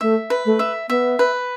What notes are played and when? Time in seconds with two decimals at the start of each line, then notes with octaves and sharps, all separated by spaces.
0.01 A3 E5
0.30 B4
0.45 A3
0.59 E5
0.89 B3 E5
1.19 B4